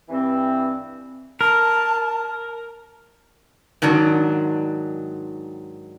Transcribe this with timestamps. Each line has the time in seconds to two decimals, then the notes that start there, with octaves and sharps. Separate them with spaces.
0.09 G2 E3 C4
1.41 A#4 A5
3.82 G#2 D#3 F#3 D4